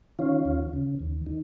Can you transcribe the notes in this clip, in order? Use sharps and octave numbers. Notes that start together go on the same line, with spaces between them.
D#3 C#4 F4
D#2
C#3
D#2
D#3